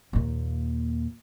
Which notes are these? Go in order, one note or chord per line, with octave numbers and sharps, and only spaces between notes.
D#2 A#2